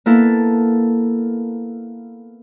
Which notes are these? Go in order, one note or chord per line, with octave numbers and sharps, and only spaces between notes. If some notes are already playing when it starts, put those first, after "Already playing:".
A#3 B3 E4 A4